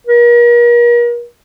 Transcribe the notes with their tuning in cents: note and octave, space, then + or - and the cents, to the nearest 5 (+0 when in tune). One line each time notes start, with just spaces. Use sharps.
A#4 +40